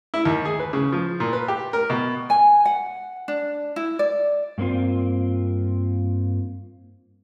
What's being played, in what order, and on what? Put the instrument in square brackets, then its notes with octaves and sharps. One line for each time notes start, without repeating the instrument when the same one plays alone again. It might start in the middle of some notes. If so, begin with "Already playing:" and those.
[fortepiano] E4
D#2
G#4
B4
C#3
F3
A#2
B4
G4
A#4
B2
[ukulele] G#5
F#5
D4
E4
D5
[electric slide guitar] G2 A#3 C4 F4